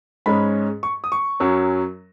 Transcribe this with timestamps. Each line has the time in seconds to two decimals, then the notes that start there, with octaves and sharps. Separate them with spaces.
0.26 G#2 G#3 C#4 B5
0.83 C#6
1.04 D#6
1.12 C#6
1.40 F#2 F#3 C#4